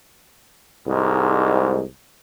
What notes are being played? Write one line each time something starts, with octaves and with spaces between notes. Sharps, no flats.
C2 G#2